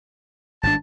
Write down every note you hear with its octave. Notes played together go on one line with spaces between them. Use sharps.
G#1 G2 D4 A5